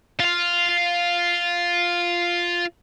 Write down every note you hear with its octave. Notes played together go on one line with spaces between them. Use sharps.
F4 F5